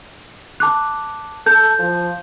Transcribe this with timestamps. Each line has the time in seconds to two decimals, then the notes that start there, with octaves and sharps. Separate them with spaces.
0.60 A5 D6 F#6
1.46 A4 G6
1.79 F3